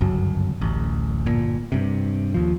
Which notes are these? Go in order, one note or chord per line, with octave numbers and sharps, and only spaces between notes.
G1 C#2 F#2 F#3
D1 A1
G1 A#2
G2 C3
D#2 F3